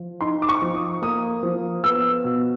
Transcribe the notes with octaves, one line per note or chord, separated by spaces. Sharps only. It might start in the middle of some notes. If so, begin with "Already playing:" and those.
Already playing: F3
D#4 C6
D6
C#6
F3
D#6
A#3 D#6
F3
B3 E6
B2